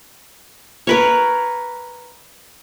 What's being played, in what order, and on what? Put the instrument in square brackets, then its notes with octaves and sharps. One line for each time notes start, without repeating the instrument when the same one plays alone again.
[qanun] A#4 B4 C#5